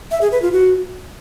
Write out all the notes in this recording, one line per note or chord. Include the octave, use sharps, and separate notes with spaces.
E5
G#4
B4
F4
F#4